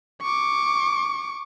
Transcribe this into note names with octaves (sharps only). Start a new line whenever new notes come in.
C#6 D6